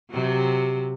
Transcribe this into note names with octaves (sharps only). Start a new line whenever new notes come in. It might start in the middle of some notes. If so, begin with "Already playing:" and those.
C3 F#3